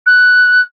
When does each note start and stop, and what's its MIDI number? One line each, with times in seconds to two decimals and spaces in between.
0.06 0.61 90